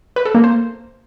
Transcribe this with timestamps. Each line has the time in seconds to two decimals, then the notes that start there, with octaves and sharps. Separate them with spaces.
0.16 B4
0.25 A4
0.35 A#3
0.44 C5